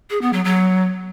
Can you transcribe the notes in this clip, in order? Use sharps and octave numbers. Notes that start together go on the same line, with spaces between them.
G#4
B3
F#3
F#3